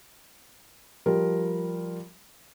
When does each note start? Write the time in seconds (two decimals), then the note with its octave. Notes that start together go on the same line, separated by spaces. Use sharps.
1.06 F3 G3 A#4